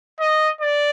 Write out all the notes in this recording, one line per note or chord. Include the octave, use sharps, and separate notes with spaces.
D#5
D5